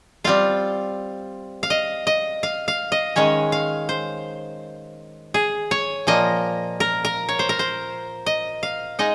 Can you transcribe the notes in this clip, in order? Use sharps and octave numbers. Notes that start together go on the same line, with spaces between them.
G3 C4 F4 F5
F5
D#5
D#5
F5
F5
D#5
D#3 G#3 C#4 C#5
F5
C5
G#4
C#5
A#2 F3 A#3 D#5
A#4
A#4
C#5
C5
A#4
C5
D#5
F5
G#3 D#4 D#5